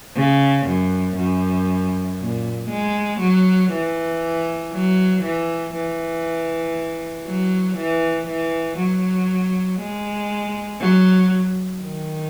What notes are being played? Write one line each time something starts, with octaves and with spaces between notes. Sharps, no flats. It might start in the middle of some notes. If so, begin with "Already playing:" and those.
C#3
F#2
F#2
A#2
G#3
F#3
E3
F#3
E3
E3
F#3
E3
E3
F#3
G#3
F#3
D#3